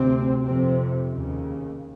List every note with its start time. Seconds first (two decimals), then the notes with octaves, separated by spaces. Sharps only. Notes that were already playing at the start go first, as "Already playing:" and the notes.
Already playing: D2 C3 C4
0.44 F2 C3 C4
1.12 D#2 C#3